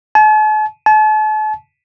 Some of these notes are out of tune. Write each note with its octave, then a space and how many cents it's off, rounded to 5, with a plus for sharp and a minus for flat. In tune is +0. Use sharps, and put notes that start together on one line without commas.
A5 -45
A5 -40